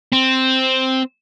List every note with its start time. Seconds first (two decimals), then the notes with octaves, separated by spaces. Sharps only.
0.13 C4